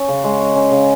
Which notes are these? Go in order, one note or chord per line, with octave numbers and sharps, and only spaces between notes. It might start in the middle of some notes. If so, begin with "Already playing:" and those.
Already playing: C#4
C#3
G#3
C#4
C#4
C#3